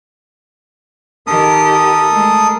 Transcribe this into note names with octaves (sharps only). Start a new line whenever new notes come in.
D#3 G4 A4 A#4 D#6
G#3 A3